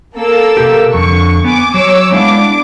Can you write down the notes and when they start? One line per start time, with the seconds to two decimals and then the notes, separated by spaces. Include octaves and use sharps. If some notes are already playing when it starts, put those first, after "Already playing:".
0.15 A#3 A4 E6
0.57 C3 G4
0.94 F2 D3 C#6
1.44 B3 G#5 D6
1.74 F#3 C#5 D6 E6
2.13 G#3 B3 D4 E4 F5 D6